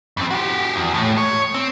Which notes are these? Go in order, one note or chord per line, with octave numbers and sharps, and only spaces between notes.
F2 C4
F#4 G4
E2
A2
C#5
C4